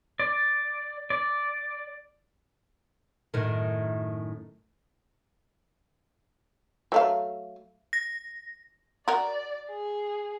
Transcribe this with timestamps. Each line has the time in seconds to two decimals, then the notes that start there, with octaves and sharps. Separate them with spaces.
0.20 D5
1.10 D5
3.34 F#2 A2 D#3
6.92 F#3 A3 F5
7.93 A#6
9.08 F#4 A#4 D5
9.70 G#4